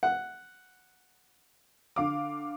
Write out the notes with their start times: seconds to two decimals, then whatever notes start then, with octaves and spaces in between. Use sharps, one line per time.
0.03 F#5
1.96 D3 F5 D6